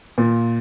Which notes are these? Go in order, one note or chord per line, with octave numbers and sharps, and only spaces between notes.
A#2